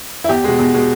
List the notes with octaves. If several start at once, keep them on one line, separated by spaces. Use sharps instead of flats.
E4
E2 G4
B2 G#3
E2
B2 G#3